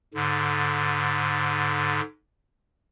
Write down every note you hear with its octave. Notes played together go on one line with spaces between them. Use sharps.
G#2 D3